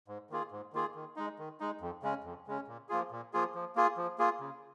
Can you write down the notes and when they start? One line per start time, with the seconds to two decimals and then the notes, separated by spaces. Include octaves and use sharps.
0.08 G#2
0.30 D#3 A#3 F4 G#4
0.51 G#2
0.73 D#3 A#3 F4 G#4
0.95 D#3
1.16 G#3 D#4
1.39 D#3
1.60 G#3 D#4
1.81 F2
2.03 C#3 G#3 C#4
2.24 F2
2.47 C#3 G#3 C#4
2.67 A#2
2.89 F3 A#3 F4 G#4
3.11 A#2
3.33 F3 A#3 F4 G#4
3.55 F3
3.76 A#3 F4 G#4
3.97 F3
4.18 A#3 F4 G#4
4.40 C#3